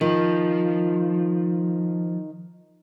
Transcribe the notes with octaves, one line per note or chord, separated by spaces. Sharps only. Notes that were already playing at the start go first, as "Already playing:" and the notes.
D#3 F3